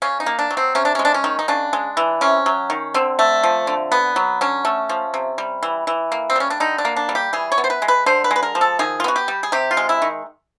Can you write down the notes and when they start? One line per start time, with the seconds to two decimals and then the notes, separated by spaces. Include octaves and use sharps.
0.02 C#3 C#4
0.20 D#4
0.26 A#3
0.39 D4
0.51 F#3
0.57 C4
0.75 C3 C#4
0.85 D4
0.95 G#3 C#4
1.05 D4
1.14 C#4
1.24 D#3
1.39 D#4
1.48 C#3 D4
1.73 G#3
1.97 E3
2.21 C3 C#4
2.46 F#3
2.70 D#3
2.94 D3 C4
3.19 A3
3.43 F3
3.67 D3
3.92 B3
4.16 F#3
4.41 D3 C#4
4.65 A3
4.89 F3
5.14 C3
5.38 G3
5.63 E3
5.87 E3
6.12 A#3
6.30 C4
6.36 G3 C#4
6.50 D4
6.60 D3 D#4
6.78 D4
6.85 A#3
6.96 D4
7.09 G3
7.15 G4
7.33 E3 G#4
7.52 C#5
7.58 B3
7.64 C5
7.70 B4
7.82 G#3
7.88 B4
8.06 D3 C5
8.24 B4
8.31 G#3
8.36 B4
8.43 A#4
8.55 F3
8.61 A4
8.79 D#3 G#4
9.00 F4
9.04 B3 F#4
9.16 G4
9.28 G3
9.43 G#4
9.52 C3 G4
9.71 F4
9.77 G#3
9.89 E4
10.02 D#3